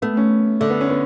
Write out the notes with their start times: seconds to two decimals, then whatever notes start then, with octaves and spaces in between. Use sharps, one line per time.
0.02 A3 B3
0.17 C#4
0.61 D3 A3
0.70 B3
0.81 C#4
0.90 B3